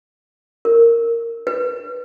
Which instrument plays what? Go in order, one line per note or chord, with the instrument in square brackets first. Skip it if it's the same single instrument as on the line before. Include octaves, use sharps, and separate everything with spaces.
[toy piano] A#4
B4